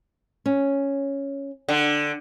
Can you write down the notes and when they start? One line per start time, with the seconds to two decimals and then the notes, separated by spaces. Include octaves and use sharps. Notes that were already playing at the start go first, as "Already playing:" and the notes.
0.46 C#4
1.69 D3